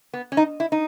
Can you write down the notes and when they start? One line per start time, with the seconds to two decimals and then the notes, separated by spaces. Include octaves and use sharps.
0.14 B3
0.32 C#4
0.37 D#4
0.60 E4
0.72 D#4